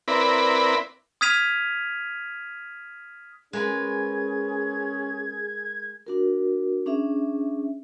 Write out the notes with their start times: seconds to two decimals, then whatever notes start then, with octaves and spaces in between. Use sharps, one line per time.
0.08 C4 E4 A#4 B4 D5 B5
1.21 D#6 F6 G#6 B6 D#7 F7
3.53 G#3 C#4 G#4 A#4 B4 G#6
6.07 D4 F#4 A#4
6.86 C#4 D4 G#4 E5